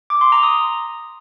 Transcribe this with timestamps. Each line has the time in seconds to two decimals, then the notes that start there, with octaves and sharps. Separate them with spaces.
0.10 D6
0.21 C6
0.32 A#5
0.43 D#6